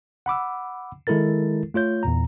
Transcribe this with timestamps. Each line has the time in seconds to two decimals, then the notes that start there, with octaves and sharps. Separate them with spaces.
0.26 F#5 B5 D6 E6
1.07 D#3 G#3 E4 A4 A#4 A6
1.74 A3 F4 C#5 G6
2.03 E2 A#2 A#5